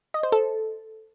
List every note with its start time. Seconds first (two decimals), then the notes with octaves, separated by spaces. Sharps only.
0.14 D#5
0.23 C5
0.32 A4